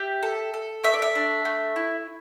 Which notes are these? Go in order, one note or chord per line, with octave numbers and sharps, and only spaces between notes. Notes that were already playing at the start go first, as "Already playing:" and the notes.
Already playing: G4 E5
A4
A4
A3 E5
D5
E5
D4
A3
E4